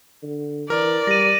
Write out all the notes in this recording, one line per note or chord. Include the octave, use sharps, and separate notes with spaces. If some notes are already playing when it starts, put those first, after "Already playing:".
D3
E3 A#4 D5
G3 A#6 D#7